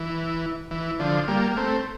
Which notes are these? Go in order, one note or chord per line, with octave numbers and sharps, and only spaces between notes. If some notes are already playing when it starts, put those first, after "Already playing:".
Already playing: E3
E3
D3 F3
G3 A#3
A#3
A3 C4